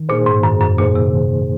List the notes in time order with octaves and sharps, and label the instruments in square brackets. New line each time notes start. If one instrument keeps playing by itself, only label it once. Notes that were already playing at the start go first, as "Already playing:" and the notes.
Already playing: [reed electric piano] D#3
[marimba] A#2 [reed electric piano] A#3 D#4 G#4 C5
[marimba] G#2
[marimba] F#2 [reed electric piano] D#3
[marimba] F#2
[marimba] A#2 [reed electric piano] A#3 D#4 G#4 C5
[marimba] C3
[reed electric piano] D#3